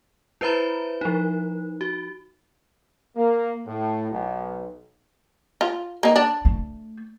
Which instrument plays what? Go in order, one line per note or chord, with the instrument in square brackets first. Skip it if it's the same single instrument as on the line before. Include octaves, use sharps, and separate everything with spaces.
[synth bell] E4 B4 C5 E5 A#5 B5
F3 D#4
F#4
[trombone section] A#3
A2
B1
[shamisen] F4
A#3 D#4
D4
[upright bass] A3